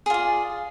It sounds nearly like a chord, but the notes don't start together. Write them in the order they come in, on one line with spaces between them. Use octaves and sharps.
G#4 F4 D5